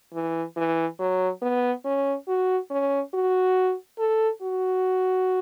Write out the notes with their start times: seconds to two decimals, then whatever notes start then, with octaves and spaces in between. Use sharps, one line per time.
0.13 E3
0.56 E3
0.99 F#3
1.42 B3
1.85 C#4
2.28 F#4
2.70 C#4
3.14 F#4
3.99 A4
4.42 F#4